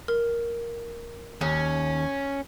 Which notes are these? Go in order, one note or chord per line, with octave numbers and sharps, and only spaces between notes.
A#4
D#2 C#4